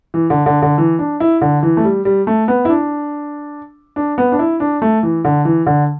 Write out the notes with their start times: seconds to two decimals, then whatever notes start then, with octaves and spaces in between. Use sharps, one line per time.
0.14 E3
0.30 D3
0.46 D3
0.62 D3
0.78 E3
0.99 D4
1.20 E4
1.41 D3
1.63 E3
1.77 A3
1.84 G3
2.05 G3
2.27 A3
2.48 B3
2.65 E4
2.69 D4
3.96 D4
4.18 B3
4.32 D4
4.39 E4
4.60 D4
4.82 A3
5.03 E3
5.25 D3
5.45 E3
5.66 D3